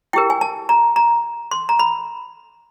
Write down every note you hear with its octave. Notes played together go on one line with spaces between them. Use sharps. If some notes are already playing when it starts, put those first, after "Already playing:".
E4 G4 A#4 G5
G#5
A5
A#5
A#5
C6
A#5
B5